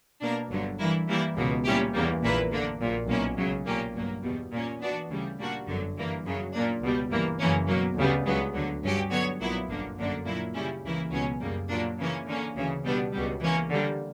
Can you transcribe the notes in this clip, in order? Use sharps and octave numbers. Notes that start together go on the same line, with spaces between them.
B2 A#3 D4 A#4
G1 G2 D3 F#3
G2 E3 A#3 E4
E3 G3 A#3 E4
C#2 B2 A#3
A#2 G3 C#4 E4 G4
E2 C#3 E3 G3 A#3
A#1 A#2 A#3 E4 B4
F#2 D3 A#3 D4
A#1 A#2 F#3
B1 B2 A#3 C#4 E4
C#2 C#3 F#3
B1 A#2 A#3 C#4 G4
G1 G2 F#3 A#3
E2 B2 G3
A#2 A#3 C#4
E3 B3 D4 F#4
D2 C#3 E3 G3
A#2 G3 A#3 D4 F#4
G1 F#2 D3 F#3
G2 E3 A#3
F#2 C#3 F#3
A#2 A#3 D4
C#2 B2 G3
G1 G2 E3 A#3
F#2 C#3 E3 A#3 C#4
B2 F#3 A#3
D2 C#3 G3 B3
C#2 C#3 F#3 B3
D2 D3 F#3
G2 F#3 C#4 G4
D3 F#3 B3 F#4 C#5
B1 A#2 F#3 B3 E4
G1 F#2 D3 A#3
G1 F#2 D3 A#3 D4
A#2 F#3 A#3 E4
C#3 G3 C#4 E4
C#2 C#3 E3 A#3 E4
C#2 B2 F#3 C#4
F#2 C#3 G3 A#3
A#2 F#3 A#3 D4
C#3 E3 A#3 C#4
D3 A#3 C#4
D2 C#3 E3
B2 G3 B3 D4
C#2 B2 G3
E3 A#3 C#4
D3 G3 A#3